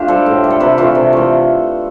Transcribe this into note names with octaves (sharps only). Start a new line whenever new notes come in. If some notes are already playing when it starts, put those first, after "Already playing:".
Already playing: A3 D4 F4 G4
G3 A4 C5
A2
G3
A4
C3 G4 B4
E3 A3 F4 A4
C3
E3 A3